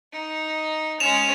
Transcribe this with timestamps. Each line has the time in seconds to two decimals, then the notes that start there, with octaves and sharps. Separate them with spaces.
0.13 D#4
1.00 G#3 C#4 E7 F7